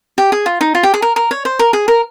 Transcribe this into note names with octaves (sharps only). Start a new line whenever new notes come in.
G4
G#4
F4
D#4
F4
G4
G#4
A#4
A#4
C#5
C5
A#4
G#4
A#4